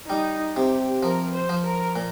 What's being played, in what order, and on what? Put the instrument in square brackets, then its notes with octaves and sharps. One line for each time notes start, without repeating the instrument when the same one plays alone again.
[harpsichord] G3 [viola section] D#4
[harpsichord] C3 [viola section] G4
[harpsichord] F3 [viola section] A#4
[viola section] C5
[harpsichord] F3
[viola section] A#4
[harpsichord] A#2